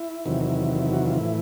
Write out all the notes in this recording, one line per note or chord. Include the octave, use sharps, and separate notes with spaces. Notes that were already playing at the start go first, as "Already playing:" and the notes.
Already playing: E4
E2 C3 D#3 F#3
F#4
F4
A2 E3 E4